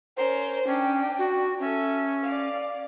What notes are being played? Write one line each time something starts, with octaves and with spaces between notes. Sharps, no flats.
C#4 A#4 C5
C#4 D4 G5
F#4
C#4 A4 E5
D5 F5